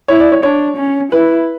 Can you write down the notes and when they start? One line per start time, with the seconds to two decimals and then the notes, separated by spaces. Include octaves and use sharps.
0.08 E4 C#5
0.20 D5
0.32 C#5
0.43 D4 C#5
0.77 C#4
1.12 E4 B4